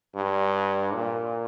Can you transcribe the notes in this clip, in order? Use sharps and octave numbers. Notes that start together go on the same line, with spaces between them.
G2
A#2